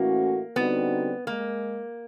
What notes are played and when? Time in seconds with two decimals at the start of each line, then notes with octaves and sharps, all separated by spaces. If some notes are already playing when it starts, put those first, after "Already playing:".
Already playing: A2 E3 A3 A#3 C#4 F#4
0.56 D3 G3 B3 C4 D#4 F#4
1.26 G#3 A#3